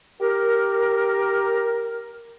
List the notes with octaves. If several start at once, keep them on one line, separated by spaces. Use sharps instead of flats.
G4 A#4